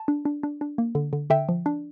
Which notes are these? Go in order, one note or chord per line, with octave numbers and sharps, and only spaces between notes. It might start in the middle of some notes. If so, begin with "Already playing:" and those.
Already playing: A5
D4
D4
D4
D4
A#3
D3
D3
D3 E5 G5
F3
D4